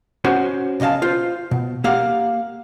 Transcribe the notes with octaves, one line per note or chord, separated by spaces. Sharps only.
C#4 F#4 C5
B1 C#3 D#5 F5 A5
F4 C5
B2
A#3 G4 F5 F#5